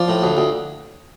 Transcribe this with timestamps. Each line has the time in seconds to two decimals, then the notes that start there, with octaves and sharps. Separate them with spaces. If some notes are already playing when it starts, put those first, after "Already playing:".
Already playing: F3 D5
0.08 A2
0.22 D2
0.37 D2